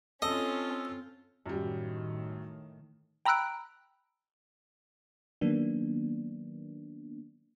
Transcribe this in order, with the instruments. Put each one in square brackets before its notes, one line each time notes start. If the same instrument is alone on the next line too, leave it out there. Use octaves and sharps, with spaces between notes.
[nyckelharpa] C4 F4 [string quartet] C#4 [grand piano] A4 [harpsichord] D#5
[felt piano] F#2 G3 [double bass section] A2 D#3
[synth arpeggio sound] G5 A#5 B5 E6 F#6 D7
[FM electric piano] D#3 F#3 A#3 B3 D4